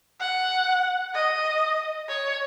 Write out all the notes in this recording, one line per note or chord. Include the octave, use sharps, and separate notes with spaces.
F#5
D#5
C#5